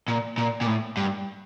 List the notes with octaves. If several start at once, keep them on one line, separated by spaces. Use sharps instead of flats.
A#2
A#2
A#2
A2
G2